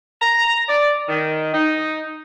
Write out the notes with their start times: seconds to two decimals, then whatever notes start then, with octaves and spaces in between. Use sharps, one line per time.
0.20 A#5
0.68 D5
1.08 D#3
1.54 D#4